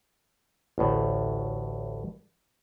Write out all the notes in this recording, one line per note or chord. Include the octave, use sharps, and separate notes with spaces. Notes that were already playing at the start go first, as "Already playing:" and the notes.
A1 D2 A2